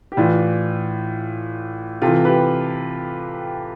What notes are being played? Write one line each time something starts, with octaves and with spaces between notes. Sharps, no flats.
G4
A2 E3 D4 F4
C3 E3 F4 A4
G4 B4